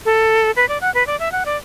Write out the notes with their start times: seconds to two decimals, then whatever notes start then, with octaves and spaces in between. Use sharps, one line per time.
0.05 A4
0.56 B4
0.69 D5
0.81 F#5
0.94 B4
1.07 D5
1.20 E5
1.32 F#5
1.46 D5